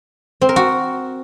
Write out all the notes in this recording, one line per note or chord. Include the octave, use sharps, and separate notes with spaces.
C4
A#4
F#4